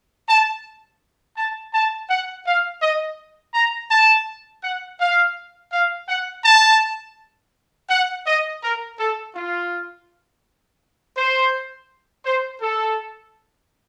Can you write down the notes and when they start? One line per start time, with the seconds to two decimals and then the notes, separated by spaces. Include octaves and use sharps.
0.28 A5
1.37 A5
1.74 A5
2.10 F#5
2.46 F5
2.82 D#5
3.54 A#5
3.91 A5
4.64 F#5
5.00 F5
5.72 F5
6.09 F#5
6.45 A5
7.90 F#5
8.27 D#5
8.62 A#4
8.99 A4
9.35 F4
11.17 C5
12.25 C5
12.62 A4